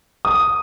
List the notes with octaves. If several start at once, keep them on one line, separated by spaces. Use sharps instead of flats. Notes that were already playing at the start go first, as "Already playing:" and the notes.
D#6